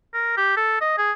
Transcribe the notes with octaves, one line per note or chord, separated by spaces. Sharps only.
A#4
G4
A4
D#5
G#4